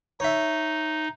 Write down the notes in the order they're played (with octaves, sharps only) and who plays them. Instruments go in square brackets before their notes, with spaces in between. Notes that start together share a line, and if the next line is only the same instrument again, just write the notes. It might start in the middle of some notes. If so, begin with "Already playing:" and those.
[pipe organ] D#4 [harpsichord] C#5 E5